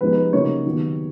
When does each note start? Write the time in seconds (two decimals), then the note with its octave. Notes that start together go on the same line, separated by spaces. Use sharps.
0.01 F3 G#3 B3 D#4 B4
0.33 C#3 F#3 A#3 D#4 C#5
0.66 D#3 F#3 B3